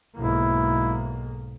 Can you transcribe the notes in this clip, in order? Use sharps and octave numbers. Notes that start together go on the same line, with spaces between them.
B1 G#2 A#3 E4